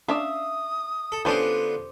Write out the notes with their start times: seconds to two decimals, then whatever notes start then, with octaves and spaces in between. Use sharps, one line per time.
0.08 C#4 D4 D5 E5 F5 D#6
1.12 A4
1.25 D3 G3 B3 C#4 D4 F4 C5 D5